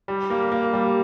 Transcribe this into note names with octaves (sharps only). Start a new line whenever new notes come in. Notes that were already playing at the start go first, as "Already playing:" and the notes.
G3
A#3
A#3
G3